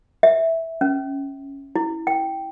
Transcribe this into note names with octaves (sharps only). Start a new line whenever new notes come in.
E5
C#4
E4
G5